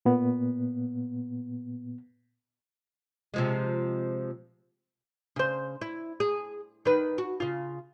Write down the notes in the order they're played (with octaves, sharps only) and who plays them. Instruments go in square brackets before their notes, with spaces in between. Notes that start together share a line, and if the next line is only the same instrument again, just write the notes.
[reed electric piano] A#2 B3
[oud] C3 F3 G#3
C#3 C5
E4
G#4
D#3 B4
F#4
C#3 F4